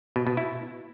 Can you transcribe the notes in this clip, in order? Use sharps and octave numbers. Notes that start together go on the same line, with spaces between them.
B2
B2
E4